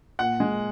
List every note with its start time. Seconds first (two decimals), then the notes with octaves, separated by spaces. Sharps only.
0.19 A#2 F#5
0.40 G#3